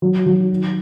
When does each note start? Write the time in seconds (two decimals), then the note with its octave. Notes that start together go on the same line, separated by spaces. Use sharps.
0.02 F#3
0.26 F#3
0.50 D#3